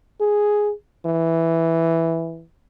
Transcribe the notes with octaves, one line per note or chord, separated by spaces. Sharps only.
G#4
E3